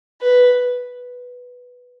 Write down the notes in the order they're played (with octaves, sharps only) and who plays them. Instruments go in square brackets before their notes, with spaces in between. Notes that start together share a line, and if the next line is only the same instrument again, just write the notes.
[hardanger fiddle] B4